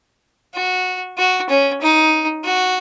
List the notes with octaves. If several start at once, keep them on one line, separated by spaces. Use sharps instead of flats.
F#4
F#4
C#4
D#4
F#4